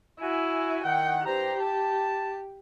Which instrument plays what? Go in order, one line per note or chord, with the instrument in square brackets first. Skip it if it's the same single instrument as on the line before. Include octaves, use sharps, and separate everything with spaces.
[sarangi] E4 [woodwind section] F#4 G#5
[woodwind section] D#3 F#5 [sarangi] G5
[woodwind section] G2 C5 A#5 [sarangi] G4
[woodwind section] A5